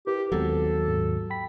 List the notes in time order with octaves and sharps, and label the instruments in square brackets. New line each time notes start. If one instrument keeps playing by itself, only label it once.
[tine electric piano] E4 A#4 B4 [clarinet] G4
[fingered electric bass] D#2 F#3 [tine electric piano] G#3 B3 C4 [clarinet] A4
[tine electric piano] G#2
G5 B5 B6